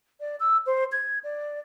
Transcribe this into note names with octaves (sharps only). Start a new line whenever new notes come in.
D5
E6
C5
G#6
D5